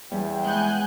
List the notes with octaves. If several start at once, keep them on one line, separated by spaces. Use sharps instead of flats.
E2 G3 B3 C#4 G5
G#3 C#4 F#5 G#5 F#6 G6